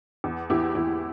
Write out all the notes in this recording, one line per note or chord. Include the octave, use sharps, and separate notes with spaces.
E2
E2 E4 G4
E2 E4